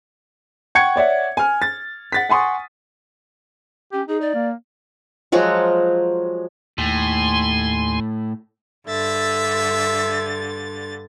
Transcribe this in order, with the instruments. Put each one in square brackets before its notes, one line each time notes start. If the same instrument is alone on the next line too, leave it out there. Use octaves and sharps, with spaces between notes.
[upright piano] F#5 G5 C#6 G#6 C#7
C#5 D5 E5 F#5
G#5 F6
A6
F#5 A6 B6
F#5 G#5 C6 C#6 D#6
[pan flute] C#4 [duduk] G4
[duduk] D#4 [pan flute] G#4
[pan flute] D5
[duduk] A#3
[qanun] F3 F#3 G#3 F#4
[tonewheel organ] D#2 G#5 C6 [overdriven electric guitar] A2
[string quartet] G2 D3 A6 [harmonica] E5